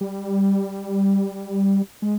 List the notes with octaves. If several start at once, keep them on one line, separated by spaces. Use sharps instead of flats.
G3
G#3